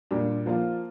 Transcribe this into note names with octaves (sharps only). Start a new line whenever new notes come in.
A#2 G3 D4
F3 A#3 F4